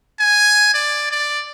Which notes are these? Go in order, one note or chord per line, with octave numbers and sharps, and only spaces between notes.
G#5
D5
D5